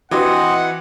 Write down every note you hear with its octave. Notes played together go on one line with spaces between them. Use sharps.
E3 C4 F#4 B4 D#5 F#5 D6